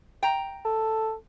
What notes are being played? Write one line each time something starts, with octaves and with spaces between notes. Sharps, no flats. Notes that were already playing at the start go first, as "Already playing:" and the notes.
G5 A#5
A4